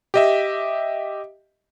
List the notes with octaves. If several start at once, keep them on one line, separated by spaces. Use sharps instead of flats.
G4 D#5 E5